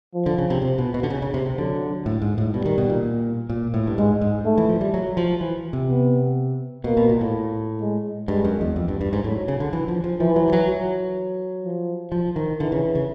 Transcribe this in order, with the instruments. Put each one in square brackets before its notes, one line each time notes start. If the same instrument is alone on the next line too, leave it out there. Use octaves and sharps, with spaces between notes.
[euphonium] F3
[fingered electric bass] D3
C#3
C3
C3
B2
B2
D3
C#3
C#3
C3
C3
[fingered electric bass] D3 [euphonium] F#3
[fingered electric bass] A2
G#2
A2
[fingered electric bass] B2 [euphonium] G3
[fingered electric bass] D#3
B2
A#2
A#2
A2
G2
[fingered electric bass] G#2 [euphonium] G#3
[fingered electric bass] G#2
[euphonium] A3
[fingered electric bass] E3
F3
G3
F#3
F3
E3
C3
[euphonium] B3
[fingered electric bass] B2 [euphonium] A#3
[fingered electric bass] B2
A#2
A2
[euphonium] G#3
[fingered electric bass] G2 [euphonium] G#3
[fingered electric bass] F#2
E2
F2
G2
G2
G#2
[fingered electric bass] A2 [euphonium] F#3
[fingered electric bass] C#3
D3
E3
F3
F3
[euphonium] E3 [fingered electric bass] F3
[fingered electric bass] F#3
F3
F#3
F#3
[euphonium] F3
[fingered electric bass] F3
D#3
[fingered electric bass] D3 [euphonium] E3
[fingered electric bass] C#3
C#3